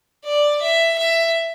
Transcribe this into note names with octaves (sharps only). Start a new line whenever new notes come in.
D5
E5
E5